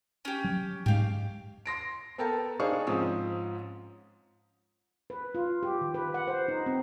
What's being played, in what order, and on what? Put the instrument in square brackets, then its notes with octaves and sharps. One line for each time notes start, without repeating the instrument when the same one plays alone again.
[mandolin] C#4 G4
[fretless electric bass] F#3
[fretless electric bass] G#2 G#3 [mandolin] G4 F5
[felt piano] C6 A#6 D7
B3 A4 A#4 G5 A5 A#5
D4 D#4 G#4 C5 F5 C#6
G#2 F3 C4 C#4 D#6
[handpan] B4
F4
G4
D#3
B4
F#5
C5
D#4
C4